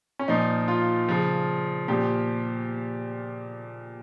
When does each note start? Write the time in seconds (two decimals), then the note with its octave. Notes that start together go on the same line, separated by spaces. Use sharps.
0.19 C#4
0.28 A#2 F3 D#4
0.68 F4
1.09 C#3 F3
1.88 A#2 F3 G4